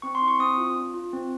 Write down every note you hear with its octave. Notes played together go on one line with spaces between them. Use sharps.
C4 C#6
C6
E4
C#6
C4 D#6
F4
D4
F4
C4